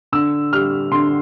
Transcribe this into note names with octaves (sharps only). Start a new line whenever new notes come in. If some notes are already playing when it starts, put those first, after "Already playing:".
D3 E6
G3 F6
D3 C6